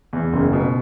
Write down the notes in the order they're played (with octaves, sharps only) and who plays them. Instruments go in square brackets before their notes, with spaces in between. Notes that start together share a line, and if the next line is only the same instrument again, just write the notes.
[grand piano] E2
F#1
B2